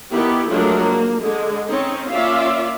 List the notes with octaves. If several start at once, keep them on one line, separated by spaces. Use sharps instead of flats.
D#3 B3 E4 G4
F3 F#3 G#3 A3 D4 A#4
A#3
D3 G#3
C4 C#4 D#4
A#3 C#4 F4 D5 E5 F5